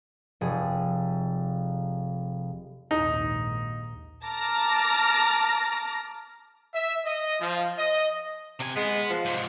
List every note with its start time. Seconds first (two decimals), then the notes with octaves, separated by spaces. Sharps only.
0.41 F1 G#4
2.91 A#1 D#2 G#2 D#4
4.26 A5 A#5 D6 F6 A#6
6.74 E5
7.05 D#5
7.41 F3
7.77 D#5
8.60 C3 G#5
8.76 G#3 B3
9.10 F3
9.25 G#2 C3